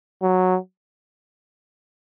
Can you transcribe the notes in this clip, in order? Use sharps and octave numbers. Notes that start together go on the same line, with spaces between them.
F#3